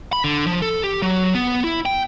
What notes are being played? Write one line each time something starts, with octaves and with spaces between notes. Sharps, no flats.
B5
D3
F3
A4
G4
F#3
B3
E4
G5